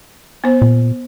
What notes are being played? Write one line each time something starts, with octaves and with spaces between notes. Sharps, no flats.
B3 C5
A#2